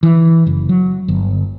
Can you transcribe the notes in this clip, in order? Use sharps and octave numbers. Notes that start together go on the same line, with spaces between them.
E3
F#1
F#3
G1